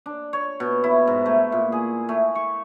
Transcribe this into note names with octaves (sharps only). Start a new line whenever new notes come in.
D4
C#5
B2
E4
G#2
A3
A#2
G#4
A3
C#6